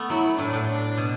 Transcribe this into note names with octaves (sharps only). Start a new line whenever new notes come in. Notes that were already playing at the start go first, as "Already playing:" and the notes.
Already playing: A3 B3
F#3 E4
A2 D4
A2
D4
B2